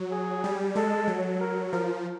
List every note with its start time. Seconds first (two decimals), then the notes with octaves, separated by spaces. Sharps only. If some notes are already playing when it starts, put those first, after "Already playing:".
Already playing: F#3
0.11 G#4
0.44 G3
0.75 G#3 A4
1.07 F#3
1.40 A#4
1.72 F3 A#4